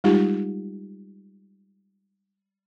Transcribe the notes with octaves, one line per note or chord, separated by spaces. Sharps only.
G3 G#3 D#4 F4 G4